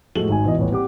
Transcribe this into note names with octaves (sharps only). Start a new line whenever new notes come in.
A2 F3 G#3 A3 F#4 F#7
G#1 D#4 F#4 G#5
B2 E3 D#5
D#1 A1 B3 C#5
G3 C4 G4 F#5 D6